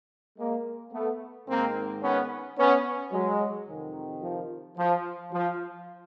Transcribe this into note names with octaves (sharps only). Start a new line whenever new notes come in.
G#3 A#3
A3 B3
G#2 D#3 A#3 C4
B3 C#4
B3 C#4
F#3 G#3
F2 C3 D#3
F3
F3
F3